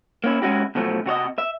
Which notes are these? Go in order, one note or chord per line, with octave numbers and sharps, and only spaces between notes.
A#3 C#4 E4
G#3 C#4 E4 F#4 G4
B2 D3 F3 F#3 A3
C3 F#4 C#5 D#5
E5